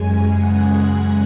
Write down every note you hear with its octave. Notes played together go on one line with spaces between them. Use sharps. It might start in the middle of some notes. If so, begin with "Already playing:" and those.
Already playing: F#2 C#3 G#3 G#5
F#5
F#5